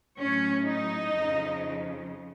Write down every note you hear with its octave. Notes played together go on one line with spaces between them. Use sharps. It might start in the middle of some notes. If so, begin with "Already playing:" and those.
A2 F#3 C#4 C#5
D#4 D#5
F2 C#3 F3